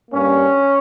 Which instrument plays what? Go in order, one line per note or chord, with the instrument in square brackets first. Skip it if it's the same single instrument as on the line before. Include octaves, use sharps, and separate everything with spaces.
[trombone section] G2 G3 A#3 C#4